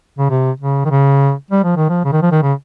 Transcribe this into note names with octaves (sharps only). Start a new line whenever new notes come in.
C#3
C3
C#3
D#3
C#3
G3
F3
D#3
F3
C#3
D#3
F3
D#3
C#3